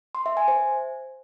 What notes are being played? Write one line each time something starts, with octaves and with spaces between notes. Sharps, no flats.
C6
E5
G#5
C5